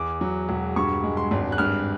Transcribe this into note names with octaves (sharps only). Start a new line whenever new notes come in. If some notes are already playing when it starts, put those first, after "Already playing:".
Already playing: E2 D6
F#3
E1
G2 C#6
G#3
C6
G#1
F#6
G2 F6